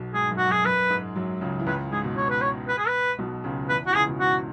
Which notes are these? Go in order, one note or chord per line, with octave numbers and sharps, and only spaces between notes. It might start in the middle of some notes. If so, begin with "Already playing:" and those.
Already playing: B1 B2
G#2 G#4
F#2
F#4
F#2
G#4
F#2 B4
G#2 G#3
F#2 F#3
C#2 C#3
E3
C#2 C#3 B4
G#2 G#4
B2
G#2 C#5
B4
C#5
B4
G#4
B4
B1 B2
C#2 C#3
E2 E3 B4
F#4
E3
C#2 C#3 G#4
B2
G#2 F#4